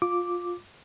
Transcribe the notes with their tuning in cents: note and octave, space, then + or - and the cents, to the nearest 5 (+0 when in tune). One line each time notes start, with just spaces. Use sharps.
F4 +15 D6 +0